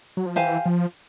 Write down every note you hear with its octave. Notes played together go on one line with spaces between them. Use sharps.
F#3
F3
E3 G4 C5 F5 G#5
F3